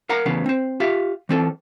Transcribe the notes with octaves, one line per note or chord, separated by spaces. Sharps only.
A#4 F5 F#5 A#5
E2 C#3 B3 F5
C4 C5
F4 G4 E5 F5
E3 C4 A4